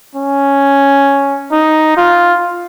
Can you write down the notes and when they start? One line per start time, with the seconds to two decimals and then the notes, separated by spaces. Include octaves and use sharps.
0.15 C#4
1.52 D#4
1.97 F4